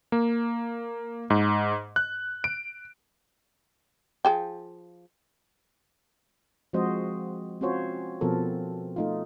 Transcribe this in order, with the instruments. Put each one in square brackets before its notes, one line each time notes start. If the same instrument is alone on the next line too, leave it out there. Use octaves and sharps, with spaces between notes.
[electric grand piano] A#3
G#2
F#6
D7
[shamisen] F3 G#4 G5
[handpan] F3 G#3 C4 F#4 C5 D#5
C4 C#4 F4 F#4 C5 C#5
B2 F3 B3 C4 A4 A#4
A3 D#4 F4